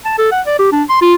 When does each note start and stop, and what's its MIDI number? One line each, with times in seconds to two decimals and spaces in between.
0.05 0.14 81
0.18 0.29 69
0.32 0.41 78
0.46 0.56 74
0.59 0.71 67
0.72 0.83 62
0.89 0.99 84
1.02 1.14 65